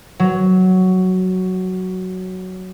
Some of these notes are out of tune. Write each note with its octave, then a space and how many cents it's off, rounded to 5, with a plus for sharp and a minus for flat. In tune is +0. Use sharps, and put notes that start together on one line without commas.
F#3 +5